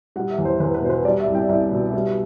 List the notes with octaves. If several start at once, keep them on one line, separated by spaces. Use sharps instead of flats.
G3 F#5
E5
E2
C5
E2 B4
B4
B2 C5
B4
G3 D5
E5
C2
G5
C2 E5
B2
G3